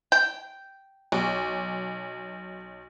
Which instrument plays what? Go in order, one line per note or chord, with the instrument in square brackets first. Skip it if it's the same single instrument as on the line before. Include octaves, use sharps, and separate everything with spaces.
[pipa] G5
[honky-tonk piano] B1